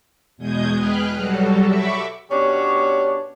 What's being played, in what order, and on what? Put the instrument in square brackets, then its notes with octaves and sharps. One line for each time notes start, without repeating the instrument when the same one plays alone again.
[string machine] E2 B2 G#3 D#6 G6 G#6
G#4 B4 G5 F6 F#6
F#3 G3 F#4 A4
E5 B5 C#6 D6 E6
[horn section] B2 B3 C#4 D4 G4 C#5